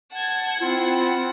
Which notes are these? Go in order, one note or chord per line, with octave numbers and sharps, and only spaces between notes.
F#5 A5 G#6
C4 E4 F4